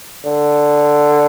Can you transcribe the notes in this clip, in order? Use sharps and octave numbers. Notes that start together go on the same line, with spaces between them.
D3